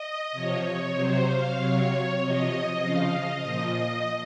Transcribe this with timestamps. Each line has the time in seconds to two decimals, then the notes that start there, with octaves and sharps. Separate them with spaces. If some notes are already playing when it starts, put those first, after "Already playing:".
Already playing: D#5
0.32 C3 F3 C#5
0.64 C#5
0.95 C3 F#3 C5
1.26 F5
1.57 C3 F#3 C#5
2.19 C3 F3 D#5
2.81 C#3 F3 F5
3.13 D#5
3.43 A#2 F3